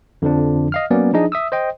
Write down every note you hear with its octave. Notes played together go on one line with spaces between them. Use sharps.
F2 D3 F3 D4
D#5 F5 F6
F#3 A#3 B3 C#4 D5
F3 D4 D#4 G#4 D#5
E5 D#6 E6
C5 D#5 G5